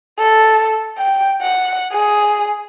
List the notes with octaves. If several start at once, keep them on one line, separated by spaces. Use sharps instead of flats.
A4
G5
F#5
G#4